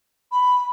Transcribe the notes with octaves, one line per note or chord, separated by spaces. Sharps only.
B5